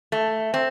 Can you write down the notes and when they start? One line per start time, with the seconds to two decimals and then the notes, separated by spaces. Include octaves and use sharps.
0.12 A3
0.54 C4